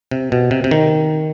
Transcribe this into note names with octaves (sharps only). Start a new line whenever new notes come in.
C3
B2
C3
C3
D#3